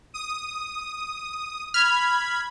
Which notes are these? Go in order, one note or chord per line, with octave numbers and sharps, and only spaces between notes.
D#6
B5 F6 G#6